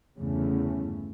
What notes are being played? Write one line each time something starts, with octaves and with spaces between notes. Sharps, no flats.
G1 E2 G2 C#3 A3 C#4